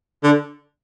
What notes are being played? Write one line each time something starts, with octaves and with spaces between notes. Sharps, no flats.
D3